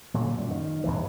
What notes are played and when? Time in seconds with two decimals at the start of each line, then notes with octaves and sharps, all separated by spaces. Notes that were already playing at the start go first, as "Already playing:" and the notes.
0.14 A#2 D3 F#3
0.38 F#2 A#2 G3
0.51 D#3
0.84 G1 C2 G2 E3